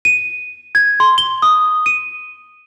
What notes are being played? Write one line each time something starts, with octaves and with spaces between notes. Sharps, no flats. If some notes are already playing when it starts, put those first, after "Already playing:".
D#7
G#6
C6
G7
D#6
D#7